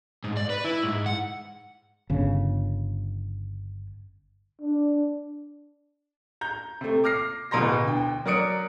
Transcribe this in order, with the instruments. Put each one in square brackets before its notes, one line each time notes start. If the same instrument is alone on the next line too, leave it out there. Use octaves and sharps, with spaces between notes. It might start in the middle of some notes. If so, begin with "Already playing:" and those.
[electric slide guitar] G#2
D5
B4
E4
G#2
F#5
[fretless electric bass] G1 C#3
[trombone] D4
[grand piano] A#5 G6
C3 A3
D6 F6 A#6 C7
D1 B2 A#5 C6 A#6
D2 G5
F#3 A#4 D5 D#6 C#7 D7